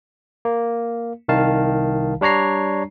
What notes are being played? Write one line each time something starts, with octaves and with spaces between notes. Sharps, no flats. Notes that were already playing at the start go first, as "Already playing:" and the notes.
A#3
C2 D#3 F5 A5
G3 D4 C#5 A#5 C7